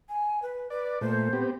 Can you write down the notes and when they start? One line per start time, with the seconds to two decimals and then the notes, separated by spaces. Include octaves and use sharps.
0.09 G#5
0.42 B4
0.70 B4 D5
1.01 A#2 A3 C5
1.33 B3 C4 G4